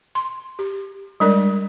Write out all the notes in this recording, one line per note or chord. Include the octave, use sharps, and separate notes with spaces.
C6
G4
G3 G#3 D4 A#4 D5